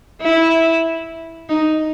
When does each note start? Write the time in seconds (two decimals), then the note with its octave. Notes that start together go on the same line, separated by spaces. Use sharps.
0.21 E4
1.49 D#4